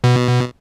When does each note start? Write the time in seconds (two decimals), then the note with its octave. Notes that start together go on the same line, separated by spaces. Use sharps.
0.04 B2